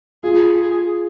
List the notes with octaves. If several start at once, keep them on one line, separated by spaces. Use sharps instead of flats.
F4 G#4
G#4